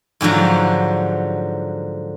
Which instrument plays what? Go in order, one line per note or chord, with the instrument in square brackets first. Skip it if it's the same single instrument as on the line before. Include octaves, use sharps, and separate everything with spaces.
[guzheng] G#2 D3 F3 F#3